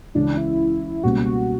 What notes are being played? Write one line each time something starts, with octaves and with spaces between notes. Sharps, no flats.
C#2 C#3 E3 D4
E4
C#2 B2 G3 A#3 C#4 F#4
F#4